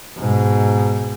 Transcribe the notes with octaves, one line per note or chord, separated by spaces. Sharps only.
G#2 B2